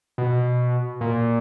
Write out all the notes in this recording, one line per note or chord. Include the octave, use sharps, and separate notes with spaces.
B2
A#2